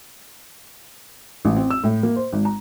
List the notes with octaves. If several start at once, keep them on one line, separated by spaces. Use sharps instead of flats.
A1
C4
E6
A2
A#3
C5
G#1
A#5